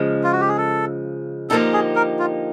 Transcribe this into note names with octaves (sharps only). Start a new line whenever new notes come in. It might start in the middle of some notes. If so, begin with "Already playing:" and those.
Already playing: C#3 F3 G#3
F4
F#4
G4
G#4
A4
D3 F3 A#3 D#4 G4 A4
G#4
A#4
F4